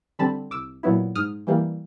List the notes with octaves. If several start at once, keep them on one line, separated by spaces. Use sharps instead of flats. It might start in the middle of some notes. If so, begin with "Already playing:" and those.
D3 G3 C4 A5 B5
C2 D6 E6
A#2 F#3 B3 E4
G#2 D#6 F6
E3 G3 A#3